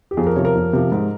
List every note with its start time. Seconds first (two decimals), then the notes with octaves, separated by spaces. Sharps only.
0.11 G4
0.17 F2 G#4
0.27 A#4
0.36 C3 F3 C#5
0.45 A#4
0.55 F2
0.73 C3 F3
0.92 G#2